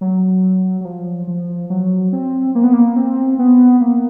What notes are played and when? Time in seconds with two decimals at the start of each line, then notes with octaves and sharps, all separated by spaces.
0.01 F#3
0.81 F#3
0.85 F3
1.27 F3
1.70 F#3
2.13 C4
2.55 A#3
2.64 B3
2.73 A#3
2.96 C4
3.39 B3
3.81 A#3